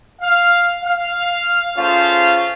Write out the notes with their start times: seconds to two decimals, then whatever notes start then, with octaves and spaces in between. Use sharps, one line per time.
0.22 F5
0.84 F5
1.77 A3 C#4 F4 G#4 C5 F5